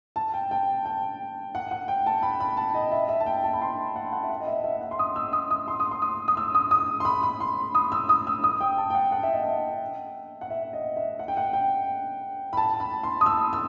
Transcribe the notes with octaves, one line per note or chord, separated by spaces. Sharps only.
A5
G5
G5
G5
F#5
F#5
G5
A5
B5
B5
A5
D#5
E5
E5
A5
G5
A5
B5
C6
F#5
F#5
E5
F#5
D#5
E5
E5
F#5
C6
D#6
E6
D#6
D#6
C6
D#6
C6
D#6
D#6
E6
D#6
D#6
C6
B5
B5
C6
D#6
E6
D#6
E6
D#6
G5
A5
G5
F#5
F#5
E5
D#5
E5
F#5
E5
D#5
E5
F#5
G5
F#5
G5
B5
A5
B5
C6
D#6
E6
E6